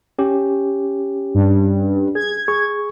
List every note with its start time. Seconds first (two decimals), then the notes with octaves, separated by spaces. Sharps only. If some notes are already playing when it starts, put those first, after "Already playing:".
0.19 C#4 G4
1.35 G2
2.15 G#4 G#6
2.48 G#4 C#6